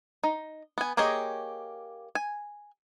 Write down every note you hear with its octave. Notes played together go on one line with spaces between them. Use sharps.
D#4
B3 G#5
A#3 G4 G#4 C#5 D#5
G#5